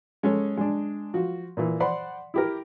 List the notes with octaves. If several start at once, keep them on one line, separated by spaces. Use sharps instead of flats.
G#3 C#4 A4 C#5
G#3 D4
F3 F#4
A#2 E3
C5 D5 F#5 B5 C6
E4 G4 A#4